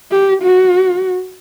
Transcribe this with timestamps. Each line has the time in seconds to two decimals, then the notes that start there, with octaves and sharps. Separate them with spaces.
0.11 G4
0.42 F#4